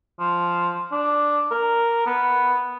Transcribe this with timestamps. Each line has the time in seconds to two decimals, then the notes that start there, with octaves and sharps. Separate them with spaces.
0.19 F3
0.92 D4
1.51 A#4
2.06 B3